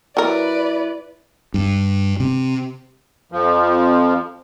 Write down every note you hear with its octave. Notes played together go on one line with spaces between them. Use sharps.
F#3 E4 A#4 B4 D5 E5
G2
C3
F2 F3